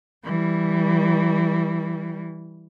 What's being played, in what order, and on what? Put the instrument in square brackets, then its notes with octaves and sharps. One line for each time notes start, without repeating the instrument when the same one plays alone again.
[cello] E3 G3